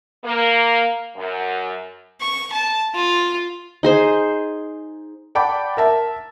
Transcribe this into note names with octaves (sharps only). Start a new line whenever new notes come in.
A#3
F#2
C#6
A5
F4
D#4 G#4 C5
D5 F#5 G5 A5 B5 D6
A#4 E5 A5